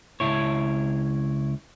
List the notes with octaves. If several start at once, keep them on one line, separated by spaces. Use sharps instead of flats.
C#2 E4 C#5